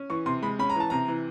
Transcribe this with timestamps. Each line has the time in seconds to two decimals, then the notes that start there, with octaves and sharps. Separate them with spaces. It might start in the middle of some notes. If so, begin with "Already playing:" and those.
Already playing: C#4
0.10 E3 C#6
0.26 C3 C6
0.43 G#3 B5
0.59 C#4 B5
0.70 A#5
0.75 E3 A5
0.90 C3 A#5
1.08 E3